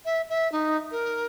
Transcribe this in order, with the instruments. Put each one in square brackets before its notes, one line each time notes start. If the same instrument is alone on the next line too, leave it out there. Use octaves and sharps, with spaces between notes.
[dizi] E5
E5
D#4
A#4